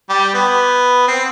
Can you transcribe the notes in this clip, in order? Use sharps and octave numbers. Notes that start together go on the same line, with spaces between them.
G3
B3
C4